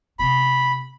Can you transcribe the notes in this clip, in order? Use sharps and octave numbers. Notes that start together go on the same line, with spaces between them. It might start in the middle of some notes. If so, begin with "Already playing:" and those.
C3 B3 B5